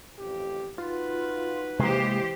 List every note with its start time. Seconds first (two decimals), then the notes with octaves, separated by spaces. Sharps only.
0.19 A1 F2 G4
0.78 D#4 F4 F#4 B4
1.79 C3 E3 G#3 A#3 G4 C5